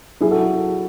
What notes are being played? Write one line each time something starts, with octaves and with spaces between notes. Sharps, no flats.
F#3 E4 G#4
F#4 A4